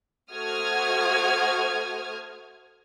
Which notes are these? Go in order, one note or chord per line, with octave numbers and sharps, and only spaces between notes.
A3 F#4 C5 D#6 F6 G#6